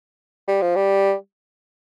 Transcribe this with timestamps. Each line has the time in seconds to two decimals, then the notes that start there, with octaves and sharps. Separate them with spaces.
0.48 G3
0.62 F3
0.75 G3